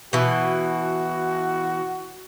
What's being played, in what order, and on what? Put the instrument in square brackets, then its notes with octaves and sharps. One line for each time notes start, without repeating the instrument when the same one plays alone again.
[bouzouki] B2 E3 [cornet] F#4